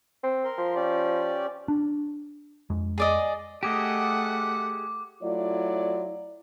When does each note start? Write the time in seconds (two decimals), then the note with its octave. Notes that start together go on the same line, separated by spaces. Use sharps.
0.23 C4
0.44 A#4 C6
0.58 F3
0.76 C#4 G4 D5
1.68 D4
2.70 F2 G#3
2.98 G#4 D5 D#5
3.63 A3 G4 G#4 D#5 F#5 D6
5.23 F#3 A3 E4 F4 C#5 D5